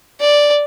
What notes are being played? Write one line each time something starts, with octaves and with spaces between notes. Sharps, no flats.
D5